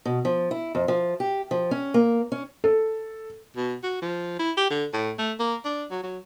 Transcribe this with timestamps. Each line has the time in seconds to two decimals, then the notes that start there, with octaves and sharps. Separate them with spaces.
0.05 B2
0.25 F3
0.51 E4
0.75 F2
0.88 F3
1.20 G4
1.51 F3
1.71 C#4
1.94 A#3
2.32 C#4
2.64 A4
3.57 B2
3.83 F#4
4.02 F3
4.39 E4
4.57 G4
4.70 D3
4.93 A2
5.18 A3
5.39 A#3
5.65 D4
5.91 F#3
6.03 F#3